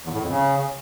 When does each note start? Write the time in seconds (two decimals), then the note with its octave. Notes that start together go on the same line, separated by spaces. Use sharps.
0.04 E2
0.12 A2
0.20 F2
0.29 C#3